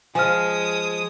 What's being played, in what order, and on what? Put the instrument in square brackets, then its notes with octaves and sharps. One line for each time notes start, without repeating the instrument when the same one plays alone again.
[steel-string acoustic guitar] F3 [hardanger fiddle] G#3 D#6 [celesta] G#5 F6